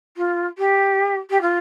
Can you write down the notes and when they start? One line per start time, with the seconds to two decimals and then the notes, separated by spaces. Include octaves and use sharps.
0.17 F4
0.58 G4
1.30 G4
1.41 F4